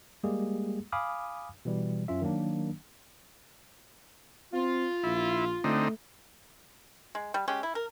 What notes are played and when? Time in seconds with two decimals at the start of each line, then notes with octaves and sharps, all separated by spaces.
0.23 G3 G#3 A#3 G4 G#4
0.92 F5 G#5 B5 D6 D#6 F6
1.65 B2 E3 G3
2.08 F#2 C#4 F4 E5
2.21 D#3 F#3 A#3 D4
4.54 C4 F4
5.04 A#1 E4
5.64 D3 A3 C4 D#4
7.15 G#3
7.34 G3
7.48 G#3 C#4 G4
7.63 E4
7.75 A#4